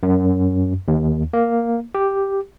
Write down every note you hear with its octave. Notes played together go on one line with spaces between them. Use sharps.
F#2
D#2
A#3
G4